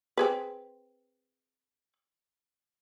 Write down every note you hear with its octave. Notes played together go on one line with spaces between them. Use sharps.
C4 G#4 B4